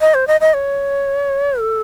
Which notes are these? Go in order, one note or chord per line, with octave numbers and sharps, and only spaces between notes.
D#5
C5
D#5
D#5
C#5
A4